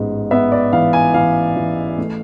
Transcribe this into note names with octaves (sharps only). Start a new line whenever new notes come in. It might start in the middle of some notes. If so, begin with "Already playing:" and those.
Already playing: A1 G#2 B3
B3 E5
D5
E3 F5
G#5
E3 F5
E3
A3